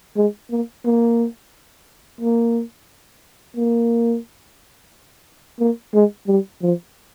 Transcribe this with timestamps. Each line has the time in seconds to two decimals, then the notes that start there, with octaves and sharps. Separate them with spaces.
0.16 G#3
0.51 A#3
0.85 A#3
2.21 A#3
3.56 A#3
5.60 A#3
5.93 G#3
6.27 G3
6.62 F3